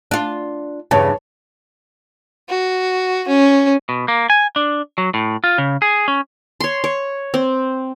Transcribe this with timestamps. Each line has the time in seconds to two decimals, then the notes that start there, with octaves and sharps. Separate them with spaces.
0.11 D4 F4
0.91 E2 G2 C#3 B4 C#5 A5
2.49 F#4
3.28 C#4
3.89 B2
4.08 A#3
4.30 G#5
4.56 D4
4.98 F#3
5.14 A2
5.44 F4
5.58 C#3
5.82 G#4
6.08 C#4
6.60 C#5 C6
6.84 C#5
7.34 C4